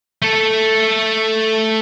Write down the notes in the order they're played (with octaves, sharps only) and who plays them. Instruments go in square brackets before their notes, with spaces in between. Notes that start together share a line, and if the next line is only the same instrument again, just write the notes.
[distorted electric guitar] A3 A4